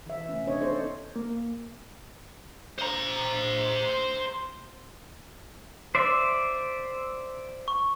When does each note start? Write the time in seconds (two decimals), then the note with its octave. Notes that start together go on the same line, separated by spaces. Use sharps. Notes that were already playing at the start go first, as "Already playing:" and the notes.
0.06 E3 E5
0.29 C3 A3 C#4
0.46 C4 D4 C#5 D#5
0.60 B3 C#4 D#4 A4 C5 D5
1.16 A#3
2.79 C5 A#5
5.95 C5 D5 E5
7.68 C#6